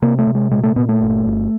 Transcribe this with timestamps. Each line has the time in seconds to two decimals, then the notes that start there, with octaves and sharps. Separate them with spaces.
0.02 C3 A#3
0.19 A3
0.27 C3
0.35 G#3
0.51 A#2 G#3
0.63 A3
0.76 A#2 B3
0.89 A3
1.01 G1
1.25 G1